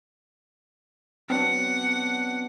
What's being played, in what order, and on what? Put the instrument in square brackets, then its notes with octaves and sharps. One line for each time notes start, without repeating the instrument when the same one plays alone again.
[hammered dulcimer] F#3 B3 D4 [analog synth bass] C4 [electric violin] F#5